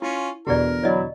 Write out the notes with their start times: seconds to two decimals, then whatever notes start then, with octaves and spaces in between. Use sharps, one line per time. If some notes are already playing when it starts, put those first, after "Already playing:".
0.02 C#4 E4 F4
0.47 E2 B2 D3 F#4 G4 A#4 D5
0.83 F#3 E4 D5 D#5